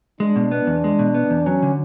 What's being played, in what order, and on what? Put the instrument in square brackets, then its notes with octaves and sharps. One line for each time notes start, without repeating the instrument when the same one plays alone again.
[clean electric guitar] G#3 [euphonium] D4
[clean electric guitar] B2
B3
E2
G#3
B2
B3
E2
[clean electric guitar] F#3 [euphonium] C#4
[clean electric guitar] D3